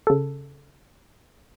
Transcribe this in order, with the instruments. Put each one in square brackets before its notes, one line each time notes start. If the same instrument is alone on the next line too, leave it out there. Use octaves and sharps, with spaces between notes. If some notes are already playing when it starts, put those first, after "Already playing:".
[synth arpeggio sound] C#3 A4